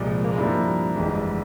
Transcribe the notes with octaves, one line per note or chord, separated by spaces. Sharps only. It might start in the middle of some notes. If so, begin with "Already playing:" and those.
Already playing: C2 A#2 F3 G#3
A#3
G#3
G2 F3 G3 A#3 E4
G1 F2 E3 G#3